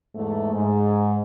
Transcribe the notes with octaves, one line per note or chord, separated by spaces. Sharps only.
E2 G#2 A3
G#2